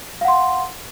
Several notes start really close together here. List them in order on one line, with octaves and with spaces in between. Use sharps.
F5 F#5 C6